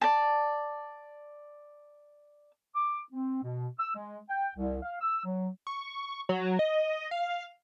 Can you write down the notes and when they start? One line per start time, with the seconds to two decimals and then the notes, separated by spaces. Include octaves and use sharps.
0.01 D5 A5
2.75 D6
3.12 C4
3.43 B2
3.79 E6
3.95 G#3
4.29 G5
4.56 C2
4.83 F5
5.01 E6
5.25 F#3
5.67 C#6
6.29 F#3
6.59 D#5
7.11 F5